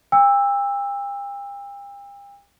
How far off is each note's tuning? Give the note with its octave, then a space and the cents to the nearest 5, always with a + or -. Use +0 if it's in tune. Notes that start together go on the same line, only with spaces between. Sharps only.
G5 +40 E6 +0